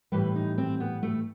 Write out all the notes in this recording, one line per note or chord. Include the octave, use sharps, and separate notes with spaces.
A2 E3 G3 B4
D#4
C4
B3
A3